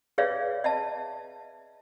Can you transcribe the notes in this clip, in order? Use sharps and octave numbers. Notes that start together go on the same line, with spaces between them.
G#4 B4 C#5 D5 E5 F5
D#5 E5 A5